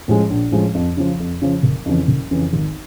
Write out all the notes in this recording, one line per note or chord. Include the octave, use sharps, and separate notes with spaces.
A2 F3 G#3 C#4
A#1
A2 F3 G#3 C#4
F2
C#3 F3
F2
C#3 F3
F#1
F2 C#3 E3
F#1
F2 C#3 E3
G#1